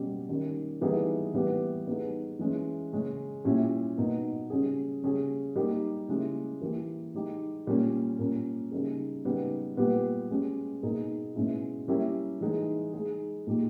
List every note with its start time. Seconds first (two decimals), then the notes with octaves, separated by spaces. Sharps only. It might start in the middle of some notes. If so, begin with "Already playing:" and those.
Already playing: B2 G3 C#4 G4
0.29 D#3 G3 C#4
0.81 E3 G3 B3 D#4 G#4
1.34 E3 G3 B3 G4
1.87 G3 B3 D#4 G#4
2.39 E3 G#3 C#4
2.93 C#3 G#3 C#4
3.45 A#2 G3 C#4 E4 G4
3.97 B2 A#3 D#4
4.50 C#3 G3 C#4 G#4
5.04 C#3 G3 C#4 G#4
5.56 G3 A#3 D#4 G4
6.08 C#3 G#3 C#4 E4 G4
6.61 E3 A#3 E4 G4
7.14 G#3 D#4 G4
7.67 A#2 G3 A#3 C#4
8.19 A#2 A#3 C#4
8.71 C#3 G3 A#3 D#4 G#4
9.25 C#3 G3 B3 D#4
9.77 A#2 G3 B3 G4
10.30 G#3 C#4 G4
10.83 B2 A#3 D#4 G#4
11.36 B2 G#3 C#4 E4
11.88 G3 A#3 C#4 E4 G4
12.41 E3 G#3 D#4 G#4
12.93 G#3 D#4 G#4
13.47 A#2 G#3 D#4 G4